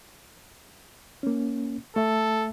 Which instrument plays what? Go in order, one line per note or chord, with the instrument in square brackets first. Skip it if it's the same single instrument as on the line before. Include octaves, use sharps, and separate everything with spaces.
[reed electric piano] A#3 C#4
[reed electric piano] A3 E5 [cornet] A4